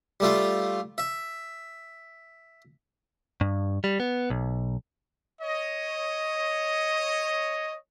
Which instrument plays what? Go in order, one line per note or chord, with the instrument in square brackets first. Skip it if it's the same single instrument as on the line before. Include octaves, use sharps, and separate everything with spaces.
[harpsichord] G3 A3 F4
E5
[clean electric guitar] G2
G3
B3
B1
[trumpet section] C#5 D#5